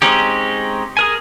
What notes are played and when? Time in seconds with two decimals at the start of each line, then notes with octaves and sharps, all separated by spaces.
0.02 G#3 C4 C#4 D#4 G4
0.97 G#4 A#4 G#5